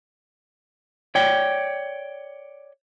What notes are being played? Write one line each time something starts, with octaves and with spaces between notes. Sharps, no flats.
C#5 D5 G5